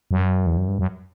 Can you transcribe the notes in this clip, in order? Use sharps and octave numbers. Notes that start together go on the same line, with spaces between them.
F#2
E2
F#2
G2
F#2